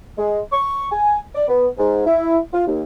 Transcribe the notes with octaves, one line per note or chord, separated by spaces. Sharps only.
G#3
C#6
G#5
D5
B3
G#2
E4
F4
D#2